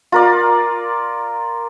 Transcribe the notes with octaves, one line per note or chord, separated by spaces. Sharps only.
F4 A#4 D5